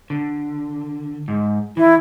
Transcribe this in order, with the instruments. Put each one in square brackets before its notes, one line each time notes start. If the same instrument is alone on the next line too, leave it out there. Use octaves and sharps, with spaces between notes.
[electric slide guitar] D3
G#2
[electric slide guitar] E3 [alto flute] E4